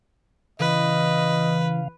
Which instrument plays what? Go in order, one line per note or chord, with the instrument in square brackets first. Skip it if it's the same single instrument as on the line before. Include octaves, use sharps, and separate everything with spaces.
[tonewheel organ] C#3 F5 [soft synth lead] E3 [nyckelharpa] B4 [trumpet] D#5